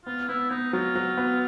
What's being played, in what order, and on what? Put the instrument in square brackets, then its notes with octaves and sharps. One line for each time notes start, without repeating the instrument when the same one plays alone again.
[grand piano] B3 [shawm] F4
[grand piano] B3 [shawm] E4
[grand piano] B3 [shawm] D#4
[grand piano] F#3 [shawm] F4
[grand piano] F#3
B3